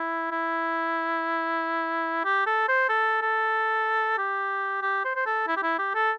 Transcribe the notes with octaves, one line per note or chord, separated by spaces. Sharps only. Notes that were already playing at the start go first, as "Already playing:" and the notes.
Already playing: E4
E4
G4
A4
C5
A4
A4
G4
G4
C5
C5
A4
E4
G4
E4
G4
A4